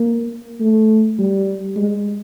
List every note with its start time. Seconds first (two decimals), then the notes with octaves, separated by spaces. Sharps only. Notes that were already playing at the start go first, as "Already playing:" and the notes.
Already playing: A#3
0.60 A3
1.19 G3
1.76 G#3